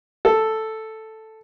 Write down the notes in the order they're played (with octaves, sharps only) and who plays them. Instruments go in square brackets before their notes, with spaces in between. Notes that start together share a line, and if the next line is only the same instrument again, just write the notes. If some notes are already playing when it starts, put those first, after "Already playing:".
[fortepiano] A4